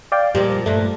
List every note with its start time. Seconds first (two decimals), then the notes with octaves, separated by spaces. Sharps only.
0.12 D5 F5 G5
0.35 A#2 F3 G3 G#3
0.66 G2 A#2 A3